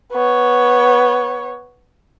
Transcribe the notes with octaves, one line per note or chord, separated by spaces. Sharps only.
B3 C#5